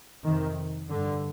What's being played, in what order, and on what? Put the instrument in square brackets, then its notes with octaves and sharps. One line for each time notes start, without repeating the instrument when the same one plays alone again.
[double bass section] F2 C3 D#3
G2 D3